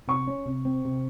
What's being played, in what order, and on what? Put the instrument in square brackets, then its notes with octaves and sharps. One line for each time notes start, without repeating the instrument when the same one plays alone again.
[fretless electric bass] C3 [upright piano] C#6
[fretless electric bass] C#4
C3
C4
C3